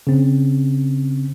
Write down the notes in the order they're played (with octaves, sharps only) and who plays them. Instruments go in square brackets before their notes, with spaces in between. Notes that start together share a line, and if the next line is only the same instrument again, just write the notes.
[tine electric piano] C#3 C4